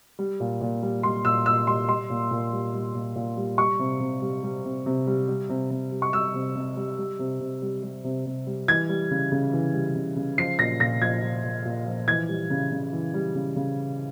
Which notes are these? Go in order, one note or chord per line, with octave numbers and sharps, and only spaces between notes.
G3
A#2
A#2
G3
G3 C6
A#2 E6
A#2 E6
G3 C6
G3 C6
A#2
A#2
G3
G3
A#2
A#2
G3
G3 C#6
C3
C3
G3
G3
C3
C3
G3
G3
C3
C3
G3
C#6
G3 E6
C3
C3
G3
G3
C3
C3
G3
G3
C3
C3
G3
E3 G#6
G3
C#3
C#3
E3
G3
C#3
C#3
F3 C7
A#2 A#6
A#2 A#6
F3 G#6
F3
A#2
A#2
F3
E3 G#6
G3
C#3
C#3
E3
G3
C#3
C#3